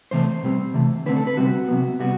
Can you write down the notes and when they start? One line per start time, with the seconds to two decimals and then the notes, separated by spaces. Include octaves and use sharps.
0.11 C3 E3 A3 C5
0.43 B2 G3 C4
0.74 C3 E3 A3
1.06 D3 A3 C4 B4
1.16 A4
1.27 B4
1.37 C3 G3 C4 F#4
1.68 C3 F#3 B3
2.00 C3 G3 B3 F#4